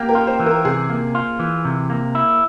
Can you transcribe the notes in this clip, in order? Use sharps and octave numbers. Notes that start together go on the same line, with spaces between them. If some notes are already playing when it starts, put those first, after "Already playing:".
Already playing: A#3 G4
A#4
F4
C5
E3
A#4
C3 G#4
A#3
F4
E3
C3
A#3
E4